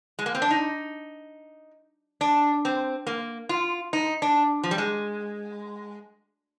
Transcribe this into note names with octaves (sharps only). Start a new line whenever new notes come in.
G#3
A#3
C4
D4
D#4
D4
C4
A#3
F4
D#4
D4
F3
G3
G#3